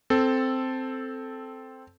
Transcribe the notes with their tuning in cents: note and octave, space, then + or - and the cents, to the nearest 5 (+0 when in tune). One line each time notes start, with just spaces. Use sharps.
C4 -5 A4 +0